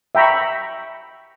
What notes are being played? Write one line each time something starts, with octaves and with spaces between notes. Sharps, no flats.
E5 G5 A#5 B5 C#6